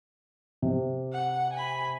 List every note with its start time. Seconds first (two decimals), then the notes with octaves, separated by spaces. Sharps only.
0.62 C3
1.12 F#5
1.53 G#5 B5